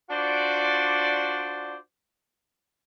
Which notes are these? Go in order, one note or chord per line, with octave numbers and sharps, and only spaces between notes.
D4 F4 F#4 C5 D5